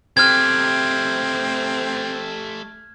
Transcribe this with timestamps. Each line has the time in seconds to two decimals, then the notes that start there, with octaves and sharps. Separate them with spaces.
0.17 A3 C4 G4 F6 G#6